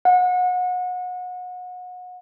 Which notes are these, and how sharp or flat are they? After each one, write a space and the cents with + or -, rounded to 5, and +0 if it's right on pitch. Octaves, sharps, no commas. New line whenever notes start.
F#5 -30